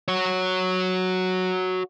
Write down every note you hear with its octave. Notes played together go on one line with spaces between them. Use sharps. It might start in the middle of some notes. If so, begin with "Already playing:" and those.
F#4 C#5